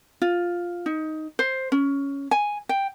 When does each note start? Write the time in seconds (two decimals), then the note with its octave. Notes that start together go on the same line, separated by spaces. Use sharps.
0.22 F4
0.86 D#4
1.39 C5
1.72 C#4
2.31 G#5
2.69 G5